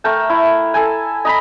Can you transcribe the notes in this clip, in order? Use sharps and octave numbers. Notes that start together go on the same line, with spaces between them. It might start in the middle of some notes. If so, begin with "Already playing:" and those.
A3 A#4 G5 A5
E4
A4 G#5
D#5 A#5 B5